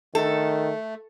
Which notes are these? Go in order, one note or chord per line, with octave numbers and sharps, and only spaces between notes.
D#3 A3 A4